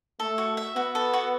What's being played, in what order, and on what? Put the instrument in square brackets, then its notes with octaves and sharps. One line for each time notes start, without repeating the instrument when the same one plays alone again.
[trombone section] A3 [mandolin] A4
[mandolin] F#4
E5
[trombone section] B3 [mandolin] F#4
[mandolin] A4
F#4